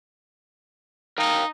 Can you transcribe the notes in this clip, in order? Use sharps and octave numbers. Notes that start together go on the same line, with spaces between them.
D#4 A#4 F5 G5